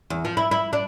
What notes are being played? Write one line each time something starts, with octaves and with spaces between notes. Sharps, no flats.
E2
F3
E4
E4
D4